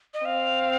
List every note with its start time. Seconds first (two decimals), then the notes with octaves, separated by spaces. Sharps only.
0.14 D#5
0.24 C4 F5